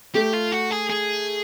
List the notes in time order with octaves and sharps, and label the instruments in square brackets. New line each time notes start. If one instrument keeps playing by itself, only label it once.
[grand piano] A3 [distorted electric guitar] G4
[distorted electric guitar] F4
F#4
G#4
G#4